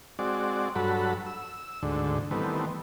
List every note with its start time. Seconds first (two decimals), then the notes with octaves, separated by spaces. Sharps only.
0.19 G#3 C4 F#4 D5
0.76 G2 F#3 F#4 A4 B5
1.26 E6
1.83 D2 G#2 D3
2.31 D#3 E3 G3 A3 B3 C4